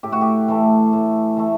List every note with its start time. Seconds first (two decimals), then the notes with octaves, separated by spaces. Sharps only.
0.03 A2 G4
0.12 F#4
0.21 G4
0.48 E3 A3
0.93 A2
1.37 E3 A3